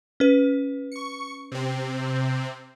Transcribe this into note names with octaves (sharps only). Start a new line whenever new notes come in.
C#4 B4
C#6 C#7
C3 C4